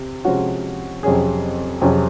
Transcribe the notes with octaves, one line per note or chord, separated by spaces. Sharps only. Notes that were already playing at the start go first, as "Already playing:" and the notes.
Already playing: C3
C3 F3 G#3 C#4 F#4
F2 C3 F#3 C#4 G#4
F2 C3 F#3 C#4 G#4